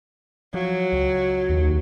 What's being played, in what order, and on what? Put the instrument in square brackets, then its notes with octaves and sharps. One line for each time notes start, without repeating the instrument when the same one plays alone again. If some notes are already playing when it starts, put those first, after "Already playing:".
[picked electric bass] F3 [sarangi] F#3
[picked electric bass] C#2
[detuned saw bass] D#2